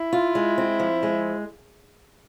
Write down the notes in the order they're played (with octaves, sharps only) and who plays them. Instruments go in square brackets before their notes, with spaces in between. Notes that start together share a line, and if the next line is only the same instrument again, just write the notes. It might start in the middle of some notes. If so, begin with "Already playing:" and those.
Already playing: [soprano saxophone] E4
[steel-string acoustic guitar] F4
G#3
C4
F3
G#3